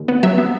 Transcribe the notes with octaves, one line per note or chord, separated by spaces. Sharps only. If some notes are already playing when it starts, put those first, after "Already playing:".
Already playing: D#2
B3
F#3 E5
B3